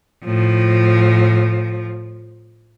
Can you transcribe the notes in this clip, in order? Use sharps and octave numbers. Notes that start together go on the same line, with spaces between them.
A2 F3